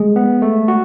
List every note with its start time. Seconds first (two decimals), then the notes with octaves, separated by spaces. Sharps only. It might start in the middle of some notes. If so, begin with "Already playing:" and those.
Already playing: G#3
0.16 B3
0.42 A3
0.68 F#4